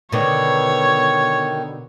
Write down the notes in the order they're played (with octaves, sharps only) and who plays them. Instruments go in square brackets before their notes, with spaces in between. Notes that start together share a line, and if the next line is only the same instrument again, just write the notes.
[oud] B2 D3 [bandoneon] D#3 [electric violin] C#5